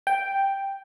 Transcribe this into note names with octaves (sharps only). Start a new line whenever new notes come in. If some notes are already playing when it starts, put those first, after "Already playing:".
G5